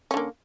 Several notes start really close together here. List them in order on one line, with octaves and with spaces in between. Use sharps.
C#4 D3 A#3